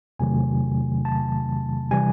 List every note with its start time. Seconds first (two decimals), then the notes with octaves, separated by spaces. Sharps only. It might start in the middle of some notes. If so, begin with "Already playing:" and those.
0.19 E2 C3 D#3 F#3 A3 G#5
1.05 A5
1.91 C3 E3 G3 G#5